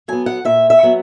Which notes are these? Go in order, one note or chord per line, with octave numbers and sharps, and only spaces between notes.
F#3 B3 G#5
F#5
A#2 E5
E5
F#3 B3